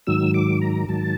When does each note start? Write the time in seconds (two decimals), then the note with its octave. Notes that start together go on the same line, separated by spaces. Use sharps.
0.07 G#2 D#3 F#3 E6
0.34 D6
0.61 A#5
0.88 G#2 D#3 F#3 A5